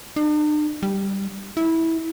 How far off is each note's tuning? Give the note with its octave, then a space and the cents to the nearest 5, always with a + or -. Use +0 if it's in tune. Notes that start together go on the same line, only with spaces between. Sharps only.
D4 +45
G3 +0
E4 -15